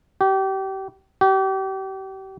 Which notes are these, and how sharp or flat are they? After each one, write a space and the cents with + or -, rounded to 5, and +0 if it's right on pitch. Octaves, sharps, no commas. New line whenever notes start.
G4 -30
G4 -35